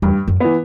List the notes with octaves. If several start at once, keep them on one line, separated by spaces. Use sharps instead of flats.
E2 G2
F#2
E3 B3